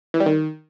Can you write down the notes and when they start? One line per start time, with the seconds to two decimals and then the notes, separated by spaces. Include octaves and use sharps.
0.14 E3
0.20 G3
0.26 D#3